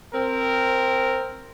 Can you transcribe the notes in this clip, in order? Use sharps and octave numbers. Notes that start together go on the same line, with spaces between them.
C4 A#4